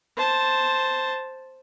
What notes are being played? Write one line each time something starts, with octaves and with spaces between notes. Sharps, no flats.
C5 A5